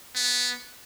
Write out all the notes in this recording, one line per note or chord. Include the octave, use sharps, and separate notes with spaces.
B3